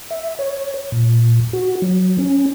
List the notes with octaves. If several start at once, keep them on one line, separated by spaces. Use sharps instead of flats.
E5
C#5
A#2
F#4
F#3
C#4